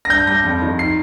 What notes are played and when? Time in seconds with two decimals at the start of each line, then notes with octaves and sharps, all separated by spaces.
0.05 A#6
0.09 G2 G6
0.27 G3 A#6
0.44 F2
0.62 D#3
0.79 C7